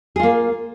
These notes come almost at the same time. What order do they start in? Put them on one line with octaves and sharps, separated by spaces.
G#4 F4 A#3